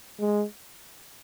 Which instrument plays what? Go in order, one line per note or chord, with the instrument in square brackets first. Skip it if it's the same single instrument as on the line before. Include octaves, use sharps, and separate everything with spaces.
[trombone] G#3